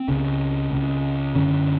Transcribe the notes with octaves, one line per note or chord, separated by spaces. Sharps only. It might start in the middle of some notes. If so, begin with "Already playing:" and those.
Already playing: C4
C#2 C#3
C#2 C#3
F#2 D3 C#4